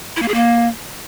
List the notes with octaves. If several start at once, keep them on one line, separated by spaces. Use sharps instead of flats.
E4
A#3
G#4
A#3